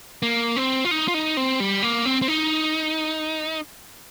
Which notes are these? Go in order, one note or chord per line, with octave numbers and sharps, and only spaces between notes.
A#3
C4
F4
D#4
F4
D#4
C4
G3
A#3
C4
C4
D#4